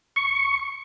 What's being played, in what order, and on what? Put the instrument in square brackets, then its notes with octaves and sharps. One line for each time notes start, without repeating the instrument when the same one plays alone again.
[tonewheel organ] C#6